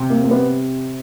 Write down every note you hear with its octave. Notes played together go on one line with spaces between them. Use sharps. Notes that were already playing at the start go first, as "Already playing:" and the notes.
Already playing: C3
A#3
A#3
B3